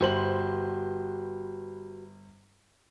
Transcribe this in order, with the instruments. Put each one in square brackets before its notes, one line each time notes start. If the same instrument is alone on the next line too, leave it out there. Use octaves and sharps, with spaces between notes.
[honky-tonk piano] G1 C5 F#7 [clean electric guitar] F#4 G4 B4